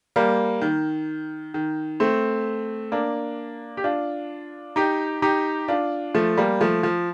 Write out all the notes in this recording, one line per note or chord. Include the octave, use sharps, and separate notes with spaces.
G3 A#3
D#3
D#3
A3 C4
A#3 D4
G4
D4 F4
D#4 G4
D#4 G4
D4 F4
F3 A3
G3 A#3
F3 A3
F3